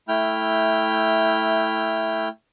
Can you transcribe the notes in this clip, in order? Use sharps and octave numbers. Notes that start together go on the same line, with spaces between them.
A3 E4 G5 F6 G6